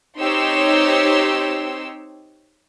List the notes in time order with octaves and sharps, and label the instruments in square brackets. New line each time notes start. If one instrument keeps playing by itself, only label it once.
[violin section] C4 D#4 G4 C#5 C6 E6